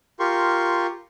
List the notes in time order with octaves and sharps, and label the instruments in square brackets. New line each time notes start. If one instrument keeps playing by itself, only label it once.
[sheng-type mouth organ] F4 G4 A#4 C6 C#6